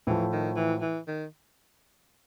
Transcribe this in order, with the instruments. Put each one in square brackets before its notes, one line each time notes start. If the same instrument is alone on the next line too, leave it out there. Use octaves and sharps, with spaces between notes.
[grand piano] A2 F3 A3 [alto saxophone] E3
[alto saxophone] D#3
E3
E3
D#3